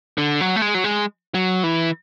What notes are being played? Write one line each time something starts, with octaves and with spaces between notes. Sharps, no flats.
D3
F#3
A3
G#3
F#3
G#3
F#3
E3